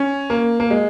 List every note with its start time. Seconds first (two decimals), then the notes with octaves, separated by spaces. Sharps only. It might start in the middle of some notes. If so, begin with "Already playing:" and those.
Already playing: C#4
0.30 A#3
0.60 A#3
0.71 G#3